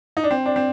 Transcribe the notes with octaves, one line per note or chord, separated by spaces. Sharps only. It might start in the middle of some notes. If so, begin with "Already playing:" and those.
D#4
D4
C4
D4
C4